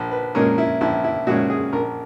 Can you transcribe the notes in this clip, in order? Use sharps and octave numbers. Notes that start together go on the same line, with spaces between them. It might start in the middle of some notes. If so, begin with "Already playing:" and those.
Already playing: A#1
B4
A#2 G#3 C#4 A#4
E4
A#1 E4
E4
A#2 G#3 C#4 F#4
G#4
A#1 A#4